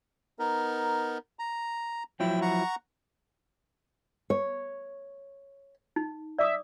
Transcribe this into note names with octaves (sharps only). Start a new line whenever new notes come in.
B3 D#4 A#4
A#5
F3 F#3 E4 G5
F#5 A#5 C#6
C#5
D#4
D5 E5 D6 D#6